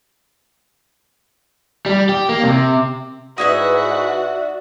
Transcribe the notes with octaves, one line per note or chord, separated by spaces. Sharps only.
G3
G4
A#3
C3
G#2 G#3 D#4 E4 F#4 B4 D5 E5